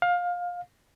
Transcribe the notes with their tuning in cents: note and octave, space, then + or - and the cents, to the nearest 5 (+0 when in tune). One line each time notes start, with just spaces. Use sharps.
F5 +20